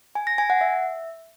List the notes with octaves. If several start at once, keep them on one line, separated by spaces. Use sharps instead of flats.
G#5
A#6
G#5
F#5
E5